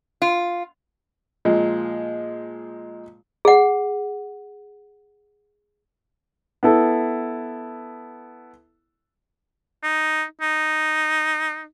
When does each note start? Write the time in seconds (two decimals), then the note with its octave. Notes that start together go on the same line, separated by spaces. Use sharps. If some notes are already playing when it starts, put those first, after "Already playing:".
0.22 F4
1.45 A#2 F3 G#3
3.45 G#4 F#5
6.63 B3 E4 A4
9.84 D#4
10.41 D#4